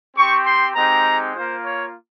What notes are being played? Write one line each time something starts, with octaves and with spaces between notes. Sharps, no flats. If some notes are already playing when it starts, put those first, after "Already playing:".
C4 G4 C#6
C6
G#3 C4 D#4 G4 A#5
A#3 F4 C5
C#5